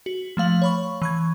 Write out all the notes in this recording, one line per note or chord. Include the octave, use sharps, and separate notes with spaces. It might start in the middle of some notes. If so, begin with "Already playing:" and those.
F#4
F3 A3 F5 F#7
C#5 B5 C#6
E3 C#6 G#6